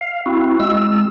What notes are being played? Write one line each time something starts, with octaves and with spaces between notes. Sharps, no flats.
F5
C4 E4 F#4
G#3 E6